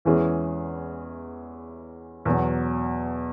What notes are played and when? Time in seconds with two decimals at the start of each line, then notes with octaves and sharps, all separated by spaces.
0.05 E2 E3 G#3 C#4 G#4
2.25 E2 B2 F#3